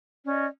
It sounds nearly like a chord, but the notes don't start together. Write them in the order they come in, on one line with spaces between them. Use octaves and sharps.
C#4 D5 D#5